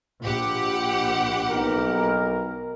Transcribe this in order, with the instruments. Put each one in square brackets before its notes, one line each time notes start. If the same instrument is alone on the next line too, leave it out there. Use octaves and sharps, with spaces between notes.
[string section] A#1 G4 F#5
[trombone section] B1 A#4